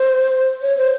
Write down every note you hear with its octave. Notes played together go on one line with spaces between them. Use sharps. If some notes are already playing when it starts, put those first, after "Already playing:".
Already playing: C5
C#5
C5